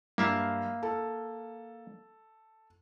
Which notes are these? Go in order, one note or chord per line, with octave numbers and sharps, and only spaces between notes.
G2 A#3 E5 F5
A4